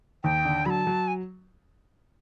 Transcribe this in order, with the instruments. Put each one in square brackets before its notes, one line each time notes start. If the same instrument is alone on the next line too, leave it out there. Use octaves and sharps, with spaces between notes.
[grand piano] D#2 [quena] G5
[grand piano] D3
[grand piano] F#3 [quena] A5 B5
[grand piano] F#3
[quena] G#5